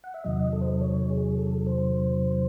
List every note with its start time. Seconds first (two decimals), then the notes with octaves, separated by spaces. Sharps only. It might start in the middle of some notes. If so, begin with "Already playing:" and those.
0.04 F#5
0.14 E5
0.24 E2 C3 D#3 F#3 D#5
0.53 A4
0.61 C5
0.70 A4
0.81 C#5
1.10 G#4
1.38 A4
1.66 C5